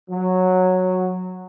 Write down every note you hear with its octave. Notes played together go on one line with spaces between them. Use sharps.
F#3